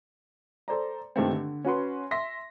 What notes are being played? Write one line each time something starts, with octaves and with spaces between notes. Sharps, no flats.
A4 C5 D5 A#5
G2 D#3 A3 C4
D3
C#4 F#4 B4 C6
E5 C6 A#6 B6